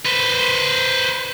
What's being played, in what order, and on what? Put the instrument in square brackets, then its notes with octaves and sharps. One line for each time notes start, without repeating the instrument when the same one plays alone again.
[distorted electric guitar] B4 C5